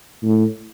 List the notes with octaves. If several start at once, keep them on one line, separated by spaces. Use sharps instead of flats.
A2